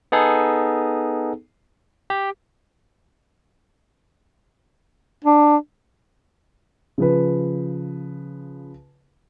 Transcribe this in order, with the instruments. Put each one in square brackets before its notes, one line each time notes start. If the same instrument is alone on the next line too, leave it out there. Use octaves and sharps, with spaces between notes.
[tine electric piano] B3 D#4 G#4 A4
G4
[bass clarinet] D4
[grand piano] C#3 F3 B4